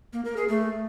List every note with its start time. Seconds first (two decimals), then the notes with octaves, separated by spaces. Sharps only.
0.13 A#3
0.25 A#4
0.37 G#4
0.48 A3